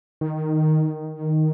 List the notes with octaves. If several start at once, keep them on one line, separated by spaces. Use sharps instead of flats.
D#3